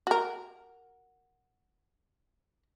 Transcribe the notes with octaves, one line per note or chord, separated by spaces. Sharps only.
F#4 A#4